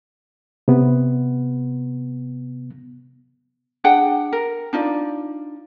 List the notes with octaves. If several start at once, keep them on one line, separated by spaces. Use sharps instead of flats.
C3 B3
D4 G#4 F#5 G5
A#4
D4 D#4 F4 D5